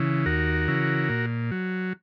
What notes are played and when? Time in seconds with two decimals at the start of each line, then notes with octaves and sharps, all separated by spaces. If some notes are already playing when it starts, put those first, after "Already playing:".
Already playing: C#3 E3
0.26 D#2 F#4 A#4
0.68 C#3 E3
1.09 A#2
1.51 F#3